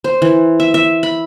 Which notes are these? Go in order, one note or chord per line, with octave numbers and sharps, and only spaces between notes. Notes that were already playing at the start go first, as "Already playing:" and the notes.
C5
E3
E5
E5
B5